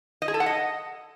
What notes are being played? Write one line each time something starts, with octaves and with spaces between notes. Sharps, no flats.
D#5
G#4
A4
F#5
D#5